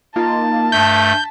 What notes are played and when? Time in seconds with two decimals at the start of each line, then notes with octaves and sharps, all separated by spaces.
0.16 A#3 D#4 F4 A5
0.72 G2 A3 G6 B6